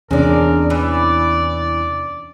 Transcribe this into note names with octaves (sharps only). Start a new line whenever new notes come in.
E2 C3 G#3 C#4 D4 A#4 D5
E3 D5